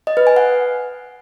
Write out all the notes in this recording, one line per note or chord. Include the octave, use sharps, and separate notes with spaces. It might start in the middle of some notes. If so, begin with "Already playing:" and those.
D#5
B4
G#5
F#5